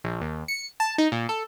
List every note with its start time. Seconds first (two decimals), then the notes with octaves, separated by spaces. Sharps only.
0.04 A#1
0.21 D#2
0.48 C#7
0.80 A5
0.98 D#4
1.12 A#2
1.29 A4